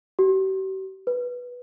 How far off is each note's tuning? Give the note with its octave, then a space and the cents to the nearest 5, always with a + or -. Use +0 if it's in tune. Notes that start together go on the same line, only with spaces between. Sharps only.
G4 -45
B4 -5